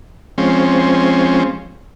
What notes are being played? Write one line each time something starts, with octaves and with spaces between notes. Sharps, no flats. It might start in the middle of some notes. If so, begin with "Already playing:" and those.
F3 G#3 C4 C#4